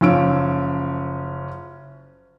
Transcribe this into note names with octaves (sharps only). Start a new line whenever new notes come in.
F#1 F3 C#4 E6 D7